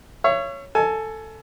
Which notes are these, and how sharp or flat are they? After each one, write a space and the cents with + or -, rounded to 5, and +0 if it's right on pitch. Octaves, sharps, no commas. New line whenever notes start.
C#5 +0 E5 +45
A4 +10 G#5 +25